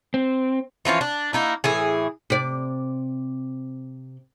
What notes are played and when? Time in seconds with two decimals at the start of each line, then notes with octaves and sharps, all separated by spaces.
0.14 C4
0.85 E3 F3 C#4 F4
1.01 D4
1.33 A#3 D#4 E4
1.64 A2 E3 G#4
2.30 C3 D5